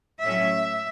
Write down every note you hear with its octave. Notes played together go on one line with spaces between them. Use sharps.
A2 F#3 A3 C#4 E5